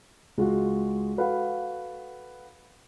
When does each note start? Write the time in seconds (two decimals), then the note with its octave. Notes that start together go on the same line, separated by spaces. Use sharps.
0.37 C#2 G#3 F4 F#4
1.17 F#4 A4 B4 F5 F#5